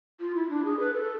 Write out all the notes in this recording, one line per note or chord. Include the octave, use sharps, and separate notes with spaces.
F4
E4
D4
G#4
B4
A4